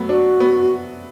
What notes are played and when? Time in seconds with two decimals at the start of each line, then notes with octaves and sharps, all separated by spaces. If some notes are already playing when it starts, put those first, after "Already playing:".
Already playing: F#3 A3 B3
0.09 D4 F#4
0.40 B3